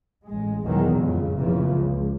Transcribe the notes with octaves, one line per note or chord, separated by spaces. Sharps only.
A1 G#3
E2 B2 D#3 F#3 G#3
F2 A2 C#3
F1 A#2 C#3 E3 F3
C#2